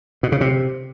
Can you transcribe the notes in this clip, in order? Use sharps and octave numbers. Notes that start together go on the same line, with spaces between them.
B2
C#3
C3